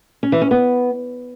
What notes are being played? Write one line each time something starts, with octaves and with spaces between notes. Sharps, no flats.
C#4
E3
C#4
B3